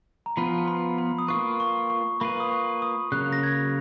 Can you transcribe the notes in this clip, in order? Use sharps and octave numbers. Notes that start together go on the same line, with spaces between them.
A#5
F3 B3 F4 B4 B5
B5
B5
D#6
A#3 F4 B4 C#6
C#6
C#6
A#3 F4 B4 B5
D#6
C#6
D#6
C#3 F#3 A#3 F#6
A#6
G#6